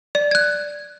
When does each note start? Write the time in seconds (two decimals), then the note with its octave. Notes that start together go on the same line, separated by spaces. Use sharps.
0.15 D5
0.31 F#6 G#6